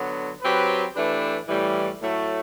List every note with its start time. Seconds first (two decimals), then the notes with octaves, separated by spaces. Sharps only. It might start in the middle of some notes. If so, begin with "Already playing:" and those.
Already playing: D3 F#3 B3
0.42 F#3 C4 G4 B4
0.95 E3 A3 D4 G4 B4
1.48 A2 E3 G3
2.01 A2 F#3 A3